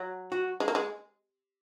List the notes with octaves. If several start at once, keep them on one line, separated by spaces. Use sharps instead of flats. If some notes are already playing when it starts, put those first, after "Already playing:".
Already playing: F#3
F#4
G#3
A#3
G#3